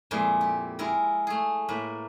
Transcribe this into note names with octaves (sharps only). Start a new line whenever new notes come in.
F2 A#2 G#3 E4 E5
G4
G#3 E4 A#4
A3 G#4
A2 A#3 B4 E5